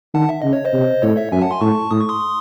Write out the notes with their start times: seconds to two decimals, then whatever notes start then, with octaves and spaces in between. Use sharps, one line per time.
0.14 D#3 F#5 A5
0.29 E5
0.42 C#3 D#5
0.53 C#5
0.65 C5 D#5
0.73 C3
1.02 A2 A4 C#5
1.17 C#5 E5
1.32 F#2 E5 G#5
1.41 F#5 A5
1.51 G#5 C6
1.61 A2 A5 C#6
1.91 A2 D#6
2.01 C#6
2.09 C6 D#6